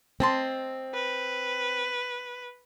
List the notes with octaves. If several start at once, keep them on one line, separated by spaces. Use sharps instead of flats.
C4 D#5 A5 C6
B4